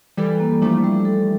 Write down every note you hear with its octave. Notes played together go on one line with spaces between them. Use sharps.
E3 G3 A4
A#3
F3 A3 D4
G3
A4